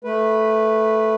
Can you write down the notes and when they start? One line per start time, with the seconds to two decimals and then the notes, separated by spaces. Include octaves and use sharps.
0.04 A3 B4